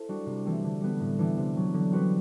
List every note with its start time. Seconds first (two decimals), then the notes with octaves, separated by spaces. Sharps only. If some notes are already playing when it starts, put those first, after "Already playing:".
Already playing: E4 A4 C5
0.08 G3 D4 F#4
0.26 C3
0.45 E3 A3 C4
0.64 D3
0.81 G3 B3
1.00 A2
1.19 E3 B3 D4 G4
1.37 C3
1.56 F#3 B3
1.74 D3
1.92 G3 C4 F#4 B4